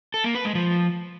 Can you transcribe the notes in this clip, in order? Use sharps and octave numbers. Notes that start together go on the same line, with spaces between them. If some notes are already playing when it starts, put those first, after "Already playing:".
A4
A#3
B4
G#3
F3